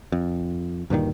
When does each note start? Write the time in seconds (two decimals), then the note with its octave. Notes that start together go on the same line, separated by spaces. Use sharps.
0.12 F2
0.90 D2 G2 A#2 D#3